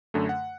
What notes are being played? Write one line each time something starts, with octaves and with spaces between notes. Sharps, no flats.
F#2 D3 A3
F#5